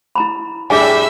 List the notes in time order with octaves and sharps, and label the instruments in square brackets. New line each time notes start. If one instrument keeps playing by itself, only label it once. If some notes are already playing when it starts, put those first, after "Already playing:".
[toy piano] E4 A#5 B5
[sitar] A2 G3 D4 [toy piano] G#4 G#5 [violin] E5 E6